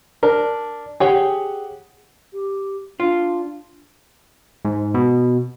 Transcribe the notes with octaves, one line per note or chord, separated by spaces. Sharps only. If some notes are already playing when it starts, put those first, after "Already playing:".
D4 A#4
G4 G#4 C#5 F#5 G5
G4
D4 F4
G#2
B2